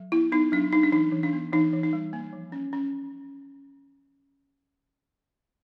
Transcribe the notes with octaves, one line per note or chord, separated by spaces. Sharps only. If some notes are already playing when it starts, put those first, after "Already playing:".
Already playing: F#3
B3 E4
B3 D#4
F#3 D4
D4 D#4
D4
E3 D#4
E3
D4
B3
E3 D#4
E3
D#4
G3
A#3
F3
C#4
C#4